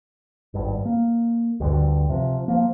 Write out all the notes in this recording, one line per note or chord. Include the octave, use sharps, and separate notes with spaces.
G#1 G2
A#3
D2 G2 D3
C3 F3
F3 A#3